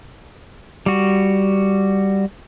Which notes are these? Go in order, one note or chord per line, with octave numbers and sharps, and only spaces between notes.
G3 F#4